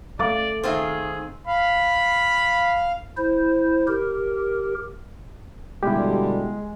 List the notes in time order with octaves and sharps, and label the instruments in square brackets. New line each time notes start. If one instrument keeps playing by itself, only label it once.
[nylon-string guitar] A3 [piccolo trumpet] D5 [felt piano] F5 D6 A6
[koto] D#3 C4 F4 [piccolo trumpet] G#4 [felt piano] C5 E5
[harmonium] F5 [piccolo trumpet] B5
[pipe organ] E4 C5
G4 A#4
[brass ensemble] B2 D3 G3 [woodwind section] G#3 [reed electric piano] E4 G4